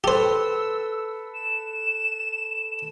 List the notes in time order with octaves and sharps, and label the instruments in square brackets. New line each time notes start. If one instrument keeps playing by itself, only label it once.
[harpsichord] G4 C5 [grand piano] A4 B4 [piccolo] E6
[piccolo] E7